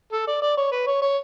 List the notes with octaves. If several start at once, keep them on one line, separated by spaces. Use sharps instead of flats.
A4
D5
D5
C#5
B4
C#5
C#5